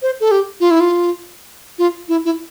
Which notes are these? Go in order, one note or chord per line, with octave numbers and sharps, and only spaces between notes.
C5
A4
G4
F4
E4
F4
F4
E4
E4